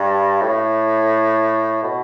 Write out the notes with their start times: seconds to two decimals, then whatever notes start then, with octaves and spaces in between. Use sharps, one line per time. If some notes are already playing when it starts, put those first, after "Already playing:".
Already playing: G2
0.42 A2
1.84 B2